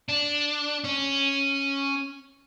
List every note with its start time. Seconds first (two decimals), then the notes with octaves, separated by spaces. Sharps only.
0.09 D4
0.84 C#4